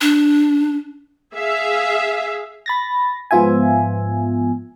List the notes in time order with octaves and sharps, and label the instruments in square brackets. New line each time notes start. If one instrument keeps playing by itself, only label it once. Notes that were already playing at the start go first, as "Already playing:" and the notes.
[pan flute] D4
[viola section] G#4 E5 F5
[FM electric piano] B5 A6 A#6
G#2 F3 B3 F4 E5 G#5